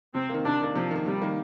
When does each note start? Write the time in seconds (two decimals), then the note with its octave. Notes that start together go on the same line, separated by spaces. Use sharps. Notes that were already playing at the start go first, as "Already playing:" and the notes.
0.15 C3 C4
0.30 D#3 A#3
0.45 C3 D4
0.61 D#3 A#3
0.75 C3 F3
0.91 D#3 A#3
1.06 C3 G3
1.22 D#3 A#3